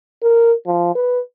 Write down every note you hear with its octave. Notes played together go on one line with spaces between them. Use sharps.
A#4
F3
B4